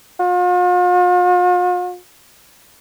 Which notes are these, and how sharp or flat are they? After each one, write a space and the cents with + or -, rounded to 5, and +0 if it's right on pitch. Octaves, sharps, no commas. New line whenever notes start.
F4 +45